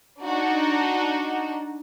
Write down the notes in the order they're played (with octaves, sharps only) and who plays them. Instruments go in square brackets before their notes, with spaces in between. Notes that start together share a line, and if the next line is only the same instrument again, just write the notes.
[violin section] D4 D#4 F#4